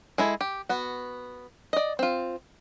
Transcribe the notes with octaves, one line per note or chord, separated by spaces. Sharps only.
G#3 E4 A4
G4
B3 F#4
D5 D#5
C4 F4